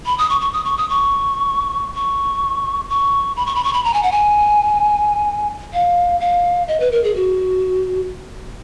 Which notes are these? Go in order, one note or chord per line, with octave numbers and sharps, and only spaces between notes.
B5
D#6
C#6
C#6
D#6
C#6
D#6
C#6
C#6
C#6
B5
C#6
B5
C#6
B5
A#5
G#5
F#5
G#5
F5
F5
D#5
B4
A#4
G#4
F#4